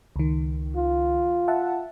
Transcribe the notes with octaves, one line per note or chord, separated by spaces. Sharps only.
C#2 D#3
F4
E5 F#5 A5